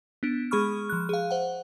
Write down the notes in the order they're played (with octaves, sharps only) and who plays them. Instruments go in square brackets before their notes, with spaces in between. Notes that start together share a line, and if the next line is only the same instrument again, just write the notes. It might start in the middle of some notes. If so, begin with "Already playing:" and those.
[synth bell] B3 D4
G#3 G#4 B5 C#6 F6
F3 F#6
G#4 F5
C5 F#5